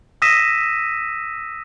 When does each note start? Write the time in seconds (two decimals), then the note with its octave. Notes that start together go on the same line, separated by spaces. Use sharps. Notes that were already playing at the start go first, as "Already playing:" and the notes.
0.22 D#6 E6 A#6 B6 D#7 E7